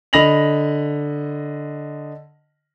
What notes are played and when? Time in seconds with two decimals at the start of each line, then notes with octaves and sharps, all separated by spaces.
0.13 D3 D#5 B5 A#6 F7 F#7